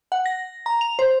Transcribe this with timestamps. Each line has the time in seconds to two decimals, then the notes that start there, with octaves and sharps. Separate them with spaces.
0.12 F#5
0.26 A#6
0.66 A#5
0.81 F7
0.99 C5